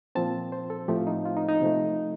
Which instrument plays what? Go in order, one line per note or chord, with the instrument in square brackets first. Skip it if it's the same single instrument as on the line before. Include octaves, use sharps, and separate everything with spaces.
[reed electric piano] A#2 F3 C4 A5
C5
A4
A2 F3 A3 C4 G4
D#4
F4
D#4
D#4
C3 F3 A3